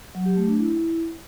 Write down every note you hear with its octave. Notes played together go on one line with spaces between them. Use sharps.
F#3
G4
A3
D4
E4